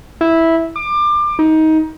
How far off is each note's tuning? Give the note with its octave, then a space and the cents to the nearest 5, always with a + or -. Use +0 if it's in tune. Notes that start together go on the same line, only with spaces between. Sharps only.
E4 -10
D6 +25
D#4 +20